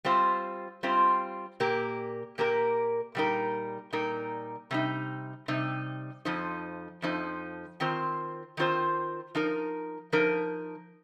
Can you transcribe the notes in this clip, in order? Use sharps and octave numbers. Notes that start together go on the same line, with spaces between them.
G3 C4 F4 C5
G3 C4 F4 C5
A#2 A#3 G4 A#4
A#2 A#3 G4 A#4
A#2 G3 D#4 A#4
A#2 G3 D#4 A#4
C3 G3 D#4
C3 G3 D#4
F2 F3 D#4 C5
F2 F3 D#4 C5
D#3 C4 F4 C5
D#3 C4 F4 C5
F3 D#4 A#4
F3 D#4 A#4